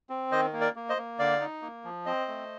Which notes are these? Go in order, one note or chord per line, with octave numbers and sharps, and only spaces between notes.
C4
D#3 C5 D#5
A#3
A#4 D5
A#3
C5 D#5
A#3
D3 D5 F5
D#4
A#3
F3
C4 C5 D#5
A3